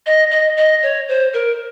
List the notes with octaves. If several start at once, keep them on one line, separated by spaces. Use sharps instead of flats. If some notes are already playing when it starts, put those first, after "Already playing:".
D#5
D#5
D#5
C#5
C5
A#4